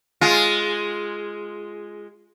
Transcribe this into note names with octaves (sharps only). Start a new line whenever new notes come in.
G#3 F4